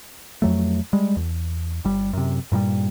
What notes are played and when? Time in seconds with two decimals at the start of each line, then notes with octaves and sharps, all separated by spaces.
0.42 F2 F#3 A3
0.93 G3 G#3
1.16 E2
1.85 G1 G3
2.13 F#2 C3
2.52 G2 A#2 D#3 G3